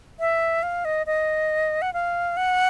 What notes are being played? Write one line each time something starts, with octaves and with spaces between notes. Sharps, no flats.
E5
F5
D#5
D#5
F#5
F5
F#5